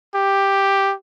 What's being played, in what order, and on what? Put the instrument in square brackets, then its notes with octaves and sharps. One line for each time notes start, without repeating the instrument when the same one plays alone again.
[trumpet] G4